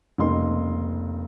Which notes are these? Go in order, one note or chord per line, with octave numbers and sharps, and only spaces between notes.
F1 C#2 A#3 D#4 D#5 C6